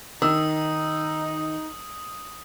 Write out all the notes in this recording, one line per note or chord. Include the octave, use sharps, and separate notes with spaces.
D#3 D#4 D#6 E6